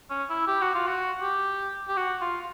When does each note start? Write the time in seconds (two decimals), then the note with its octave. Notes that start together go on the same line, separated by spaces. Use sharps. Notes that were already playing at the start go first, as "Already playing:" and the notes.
0.10 C#4
0.29 E4
0.47 G4
0.61 F#4
0.75 F4
0.87 F#4
1.22 G4
1.88 G4
1.97 F#4
2.21 F4